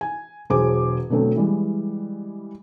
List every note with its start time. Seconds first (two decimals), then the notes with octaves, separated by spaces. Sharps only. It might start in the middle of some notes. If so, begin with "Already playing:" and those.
0.01 G#5
0.50 E1 F#3 G#4 C5 G#5 D6
1.10 B2 D3 F#3 A3 C4
1.36 E3 G3 G#3